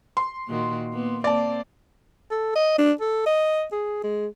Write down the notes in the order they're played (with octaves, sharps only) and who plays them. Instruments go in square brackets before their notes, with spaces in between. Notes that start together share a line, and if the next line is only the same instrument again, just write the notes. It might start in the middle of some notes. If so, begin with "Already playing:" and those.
[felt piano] C6
[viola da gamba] A#2 D#3 F#4
A#3 B3
[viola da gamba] A#3 C4 [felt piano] D5 A5
[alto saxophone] A4
D#5
D4
A4
D#5
G#4
G#3